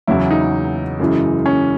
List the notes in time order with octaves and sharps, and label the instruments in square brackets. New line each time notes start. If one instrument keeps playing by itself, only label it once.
[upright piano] E2 C#3 F#3 [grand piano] E4
[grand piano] D#4
[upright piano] F#2 C#3 E3 G#3
[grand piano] C#4